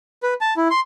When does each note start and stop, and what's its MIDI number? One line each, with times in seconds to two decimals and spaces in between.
0.23 0.34 71
0.41 0.54 81
0.57 0.68 64
0.70 0.80 84